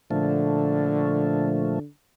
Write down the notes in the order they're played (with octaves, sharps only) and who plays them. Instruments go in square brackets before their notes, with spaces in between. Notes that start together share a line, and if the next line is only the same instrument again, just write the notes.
[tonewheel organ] A#2 F3 A3 [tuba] D3